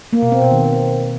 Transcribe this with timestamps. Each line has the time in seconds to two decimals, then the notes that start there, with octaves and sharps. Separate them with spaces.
0.13 A#3
0.22 B2
0.32 C4
0.42 B2
0.51 D#3